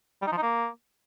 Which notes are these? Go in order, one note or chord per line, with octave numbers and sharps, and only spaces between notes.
G3
D#4
F3
D#4
A#3